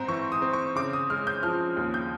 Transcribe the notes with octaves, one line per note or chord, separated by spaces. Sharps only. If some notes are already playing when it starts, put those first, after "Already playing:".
Already playing: G#2 C4 A#5 C6
E3 C#6
D#6
C4
C#6
C#3 D6
D#6
G#3 F6
G6
F3 F6
D#2
G6